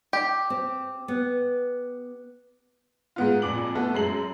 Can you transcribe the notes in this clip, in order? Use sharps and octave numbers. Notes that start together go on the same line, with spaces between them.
G4
C4
B3
G#2 B3 F4
F2 A#2 D6 F#7
A3 B3 A4
F#2 G#3 C7 F#7